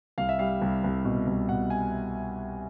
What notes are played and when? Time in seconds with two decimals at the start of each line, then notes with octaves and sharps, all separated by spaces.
0.18 C2 F5
0.29 E5
0.39 G3 F5
0.61 C2
0.84 C2
1.05 B2
1.27 C2
1.49 B2 F#5
1.70 G#5